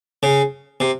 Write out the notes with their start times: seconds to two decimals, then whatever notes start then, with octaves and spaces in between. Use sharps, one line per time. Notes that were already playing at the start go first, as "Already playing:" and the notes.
0.23 C#3
0.80 C3